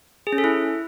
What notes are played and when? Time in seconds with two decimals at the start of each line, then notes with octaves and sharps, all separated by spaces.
0.27 G#4
0.32 C#4
0.38 A4
0.44 E4